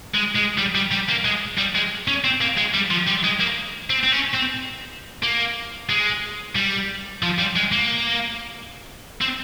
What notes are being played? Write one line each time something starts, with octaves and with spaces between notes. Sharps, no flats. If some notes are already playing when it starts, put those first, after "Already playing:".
G#3
G#3
G3
G3
G3
A#3
G#3
G3
G#3
C#4
C4
A#3
G#3
G3
F3
G3
G#3
A#3
C4
C4
C#4
C4
A#3
G#3
G3
F3
G3
G#3
A#3
C4